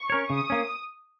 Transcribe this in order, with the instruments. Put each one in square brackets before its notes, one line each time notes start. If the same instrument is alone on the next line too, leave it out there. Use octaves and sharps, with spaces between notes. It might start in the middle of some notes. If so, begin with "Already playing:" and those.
Already playing: [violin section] C#6
[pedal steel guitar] C#4 A#4 C#5
[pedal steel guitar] C#3 [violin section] D#6
[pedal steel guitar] A#3 C#4